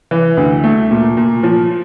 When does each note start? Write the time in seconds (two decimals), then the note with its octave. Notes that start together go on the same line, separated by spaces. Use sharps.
0.11 E3
0.37 D2
0.64 A3
0.91 A#2
1.17 A#2
1.43 F3